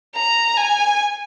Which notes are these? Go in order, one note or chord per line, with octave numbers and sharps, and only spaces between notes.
A#5
G#5